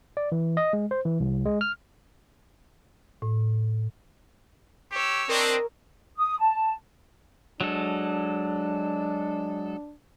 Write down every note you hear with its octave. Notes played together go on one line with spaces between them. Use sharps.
D5
E3
D#5
G#3
C5
E3
C2
G#3
F6
A2
G4 C#5 E6
C4 D4 A#4 D#5
D#6
A5
F#3 G#3 D4 A4